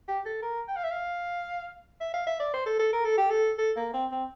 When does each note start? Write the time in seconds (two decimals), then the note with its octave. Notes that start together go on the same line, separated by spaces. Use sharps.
0.08 G4
0.26 A4
0.42 A#4
0.69 G5
0.76 F5
0.84 E5
0.91 F5
2.01 E5
2.14 F5
2.27 E5
2.40 D5
2.54 C5
2.66 A4
2.80 A4
2.93 A#4
3.05 A4
3.18 G4
3.31 A4
3.59 A4
3.77 A#3
3.94 C4
4.12 C4